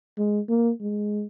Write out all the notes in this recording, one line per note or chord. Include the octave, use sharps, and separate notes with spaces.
G#3
A#3
G#3